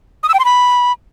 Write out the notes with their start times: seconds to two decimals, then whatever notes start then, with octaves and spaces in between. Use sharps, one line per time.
0.23 D#6
0.29 E6
0.34 G5
0.39 C6
0.45 B5